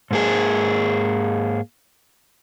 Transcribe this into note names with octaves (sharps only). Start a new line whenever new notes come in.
G#2 A#3 G#4